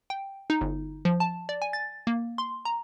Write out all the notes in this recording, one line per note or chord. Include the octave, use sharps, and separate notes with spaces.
G5
D#4
G1
F3
A5
D5
G#5
A6
A#3
C6
A#5